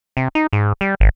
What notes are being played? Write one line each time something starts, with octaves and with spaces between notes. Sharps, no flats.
C3
D#4
G#2
G3
G#1